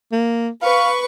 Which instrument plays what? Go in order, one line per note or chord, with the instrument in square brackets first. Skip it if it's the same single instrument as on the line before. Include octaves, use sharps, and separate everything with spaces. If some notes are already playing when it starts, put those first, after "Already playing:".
[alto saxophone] A#3
[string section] B4 C#6 [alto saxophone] F5